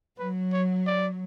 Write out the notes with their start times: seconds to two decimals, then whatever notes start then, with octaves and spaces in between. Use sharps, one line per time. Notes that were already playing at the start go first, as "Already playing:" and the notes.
0.18 F#3 B4
0.53 C#5
0.87 D5